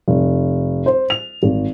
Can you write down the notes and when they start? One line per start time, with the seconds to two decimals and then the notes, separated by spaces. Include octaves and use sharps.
0.08 F1
0.86 C5
1.10 F7
1.43 G#1